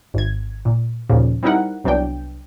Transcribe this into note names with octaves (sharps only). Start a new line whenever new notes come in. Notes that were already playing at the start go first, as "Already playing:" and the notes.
G#1 G#6
A#2
D#2 A#2 C#3 F3
G3 C4 D#4 E4 A#4 F#5
C2 F#3 B3 D4 G5